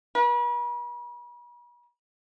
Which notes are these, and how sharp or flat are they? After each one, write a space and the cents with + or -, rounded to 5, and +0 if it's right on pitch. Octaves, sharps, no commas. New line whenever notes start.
B4 -45